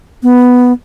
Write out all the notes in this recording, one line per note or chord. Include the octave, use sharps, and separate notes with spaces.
B3